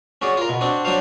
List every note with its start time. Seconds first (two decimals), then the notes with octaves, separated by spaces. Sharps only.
0.22 C#4 F#4 G#4 D5
0.37 F4 A#4
0.49 B2
0.61 C4 D4 F#4
0.85 F#3 D4 F#4 C5 F5